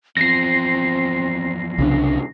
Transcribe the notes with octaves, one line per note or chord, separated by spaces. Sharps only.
E2 F3 C4 A#6 C7
C2 C#3 D4